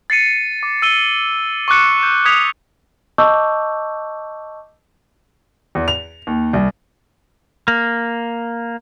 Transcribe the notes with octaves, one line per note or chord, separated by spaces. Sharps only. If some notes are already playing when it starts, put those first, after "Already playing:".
A6 C7 C#7 D#7
D6
E6 D#7 G7
C#6 D6 F#6 C#7
G6
D#6 G#6 B6 C#7 F7
D#5 A5 C#6 D6 E6 G6
E2
F7
D#2
C2
A#3